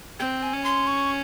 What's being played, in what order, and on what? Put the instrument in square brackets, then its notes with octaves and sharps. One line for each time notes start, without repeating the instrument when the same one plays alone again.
[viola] C4 [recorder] G5
[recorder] G#5
[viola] C#4
[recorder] C6
C#6